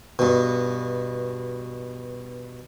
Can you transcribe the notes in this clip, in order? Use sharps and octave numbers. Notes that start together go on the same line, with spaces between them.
G2 B2